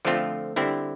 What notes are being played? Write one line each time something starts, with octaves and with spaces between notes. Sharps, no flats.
D3 F3 A3 C4 F4
D3 G3 C4 E4